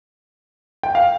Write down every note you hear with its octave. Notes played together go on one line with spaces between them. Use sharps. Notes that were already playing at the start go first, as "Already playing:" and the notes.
G5
F5